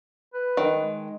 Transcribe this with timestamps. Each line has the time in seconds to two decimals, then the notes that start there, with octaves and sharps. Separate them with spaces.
0.34 B4
0.57 D#3
0.76 G#3